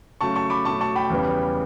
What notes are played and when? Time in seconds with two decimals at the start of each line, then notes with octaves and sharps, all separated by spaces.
0.21 C#3 F#3 A3 A5 C#6
0.36 A5 C#6
0.50 B5 D6
0.65 B2 F#3 A3 A5 C#6
0.81 A5 C#6
0.95 G5 B5
1.10 E2 C#3 E3 G3 B3